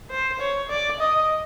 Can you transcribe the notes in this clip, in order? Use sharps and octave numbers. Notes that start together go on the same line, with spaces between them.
C5
C#5
D5
D#5